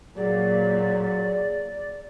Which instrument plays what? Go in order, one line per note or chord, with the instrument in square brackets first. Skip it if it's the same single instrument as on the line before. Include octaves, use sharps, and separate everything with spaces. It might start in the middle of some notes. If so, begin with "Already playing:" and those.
[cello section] A#2 [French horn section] F#3 [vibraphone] G#4 [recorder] D5